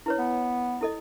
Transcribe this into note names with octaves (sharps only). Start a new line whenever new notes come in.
E4 B4 C#5
B3
E4 A4 D#5